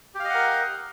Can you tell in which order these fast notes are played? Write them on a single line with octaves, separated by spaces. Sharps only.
G4 F5 D#5 F#5 A#4